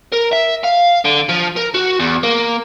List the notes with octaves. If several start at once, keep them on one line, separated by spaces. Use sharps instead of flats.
A#4
E5
F5
D3
F3
A#4
F#4
E2
A#3